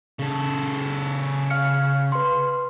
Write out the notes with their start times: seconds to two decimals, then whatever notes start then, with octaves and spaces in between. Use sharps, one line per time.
0.19 C#3 A4
1.50 F5 F6 C#7
2.12 B4 C6